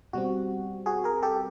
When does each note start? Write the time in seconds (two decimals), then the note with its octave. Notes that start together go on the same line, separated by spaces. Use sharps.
0.13 B2 G3 C4 F#4
0.86 F#4 G#4
1.04 G#4 A#4
1.22 G4 A4